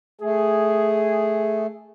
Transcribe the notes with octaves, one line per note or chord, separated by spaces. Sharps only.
A3 G#4